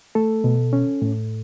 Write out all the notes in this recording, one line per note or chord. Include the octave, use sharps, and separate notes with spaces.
A3 A4
B2
C#4
A2